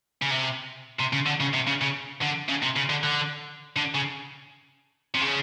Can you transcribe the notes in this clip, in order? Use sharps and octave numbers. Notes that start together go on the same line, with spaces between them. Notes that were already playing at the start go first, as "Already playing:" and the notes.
C#3
C3
C3
C#3
D3
C#3
C3
C#3
C#3
D3
C#3
C3
C#3
D3
D3
D3
C#3
C3
C#3